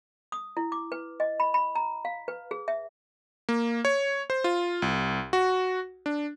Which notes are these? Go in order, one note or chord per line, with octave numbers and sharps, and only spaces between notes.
D#6
E4
D6
B4
D#5
B5
B5
A#5
F5
B4
G#4
E5
A#3
C#5
C5
F4
C2
F#4
D4